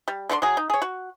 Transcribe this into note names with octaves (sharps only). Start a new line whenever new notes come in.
G3
D3 A3 D5 C6
F#3 G#4
D#4
G#4 C#5
F#4